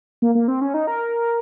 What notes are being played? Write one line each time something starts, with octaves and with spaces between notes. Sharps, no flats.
A#3
A#3
C4
C#4
D#4
A#4